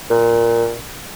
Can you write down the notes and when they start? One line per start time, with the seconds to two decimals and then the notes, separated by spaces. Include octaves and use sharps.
0.10 A#2